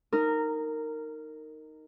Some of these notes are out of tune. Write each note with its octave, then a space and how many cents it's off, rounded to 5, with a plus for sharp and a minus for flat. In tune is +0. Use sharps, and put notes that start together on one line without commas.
D#4 +0 A#4 -15